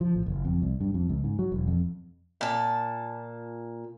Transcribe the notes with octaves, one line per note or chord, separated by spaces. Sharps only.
F3
A1
F#1
F2
C2
G2
F2
C#2
G#2
F#3
E1
F2
A#2 A5